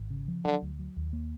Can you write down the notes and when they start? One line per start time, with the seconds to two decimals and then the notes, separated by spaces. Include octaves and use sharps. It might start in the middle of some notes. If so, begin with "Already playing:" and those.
Already playing: G#1
0.10 C#3
0.28 F3
0.45 D3 F#3
0.62 D2
0.79 F#3
0.97 D#2
1.13 A#3